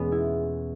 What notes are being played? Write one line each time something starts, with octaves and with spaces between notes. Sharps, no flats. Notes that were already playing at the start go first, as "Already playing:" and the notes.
Already playing: E2 B2 G#3 B3 C#4
E4